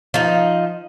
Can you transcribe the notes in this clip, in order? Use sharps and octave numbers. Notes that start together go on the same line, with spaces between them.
F3 D#4